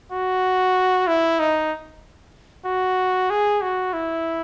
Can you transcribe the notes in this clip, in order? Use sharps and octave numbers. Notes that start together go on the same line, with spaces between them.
F#4
E4
D#4
F#4
G#4
F#4
E4